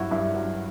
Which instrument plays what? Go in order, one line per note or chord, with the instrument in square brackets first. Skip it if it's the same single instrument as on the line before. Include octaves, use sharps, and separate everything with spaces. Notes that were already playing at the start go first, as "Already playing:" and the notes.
Already playing: [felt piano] G2 F#3 E4 F#4
G2 E4
F#3